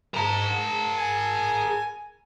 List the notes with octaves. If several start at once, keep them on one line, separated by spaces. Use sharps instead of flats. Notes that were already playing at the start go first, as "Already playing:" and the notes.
G#4 A#4 A5 A#5
G#5